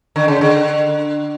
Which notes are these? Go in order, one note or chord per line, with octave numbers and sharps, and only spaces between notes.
D3
C#3
D3